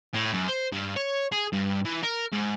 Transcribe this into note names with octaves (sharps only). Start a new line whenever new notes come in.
A2
F#2
C5
G2
C#5
G#4
G2
E3
A#4
G#2